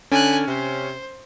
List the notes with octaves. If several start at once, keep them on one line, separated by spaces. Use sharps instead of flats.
D3 C#4 G#5 F#6
C3 C5